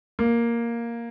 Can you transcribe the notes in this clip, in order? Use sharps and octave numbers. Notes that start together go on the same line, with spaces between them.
A#3